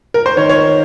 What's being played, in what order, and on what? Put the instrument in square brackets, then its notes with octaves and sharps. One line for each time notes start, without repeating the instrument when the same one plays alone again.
[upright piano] A#4
C5
[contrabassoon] D#3 [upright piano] C#5
[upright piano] C#5